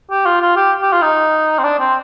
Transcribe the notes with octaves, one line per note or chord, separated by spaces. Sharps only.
G4
F4
F4
G4
G4
F4
D#4
C4
D4
C4